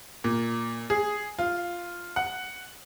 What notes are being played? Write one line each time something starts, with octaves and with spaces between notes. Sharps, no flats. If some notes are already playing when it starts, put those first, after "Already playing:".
A#2
G#4
F4
F#5